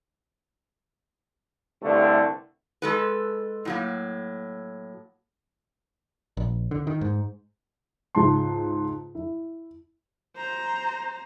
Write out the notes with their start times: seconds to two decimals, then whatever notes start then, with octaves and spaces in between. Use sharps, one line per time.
1.82 C2 G2 D3 A3
2.82 G#3 A4 B4
3.65 A2 F#3 A#3
6.37 A#1
6.71 D3
6.87 D#3
7.01 G#2
8.15 C#2 G#2 A5 C6
9.15 E4
10.37 C5 A#5